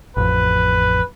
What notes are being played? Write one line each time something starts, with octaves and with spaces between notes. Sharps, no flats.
A1 F2 B4